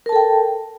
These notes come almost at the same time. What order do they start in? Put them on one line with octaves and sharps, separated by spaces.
A#4 A5 A4 G5